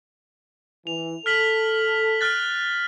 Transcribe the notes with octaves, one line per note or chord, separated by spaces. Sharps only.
E3 F7
A4 F6 B6 F#7
F6 F#6 A6